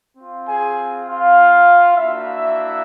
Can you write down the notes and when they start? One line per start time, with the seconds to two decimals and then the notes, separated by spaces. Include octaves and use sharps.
0.17 C4 F4
0.47 G#4 G#5
1.07 F4 F5
1.96 A#3 D4 E4 F#4 E5